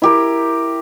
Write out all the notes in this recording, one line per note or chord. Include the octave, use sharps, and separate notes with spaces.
E4 G4 A#4